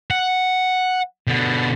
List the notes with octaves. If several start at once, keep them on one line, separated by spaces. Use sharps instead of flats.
F#5
B2 D3